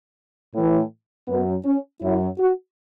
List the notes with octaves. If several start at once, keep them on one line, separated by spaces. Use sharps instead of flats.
A2 E3
F#2 F#3 B3
C#4
F#2 F#3 E4
F#4